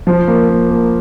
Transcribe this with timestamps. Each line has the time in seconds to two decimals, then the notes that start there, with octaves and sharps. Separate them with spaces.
0.07 F3
0.27 A#3
0.49 A#3
0.69 A#3